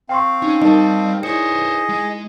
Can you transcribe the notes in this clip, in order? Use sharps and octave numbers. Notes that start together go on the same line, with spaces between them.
C4 F5 G5 C6 C#6
C#4 D#4
G3 D#4 A#4 D#5 A5 C#6
E4 G#4 C5 C#5 D#5 C#7
G#3